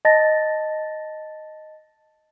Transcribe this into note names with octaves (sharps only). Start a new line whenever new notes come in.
D#5 A5 A6 A#6